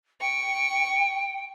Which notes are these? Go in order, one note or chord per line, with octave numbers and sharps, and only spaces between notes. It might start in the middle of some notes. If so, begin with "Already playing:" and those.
G5 C#6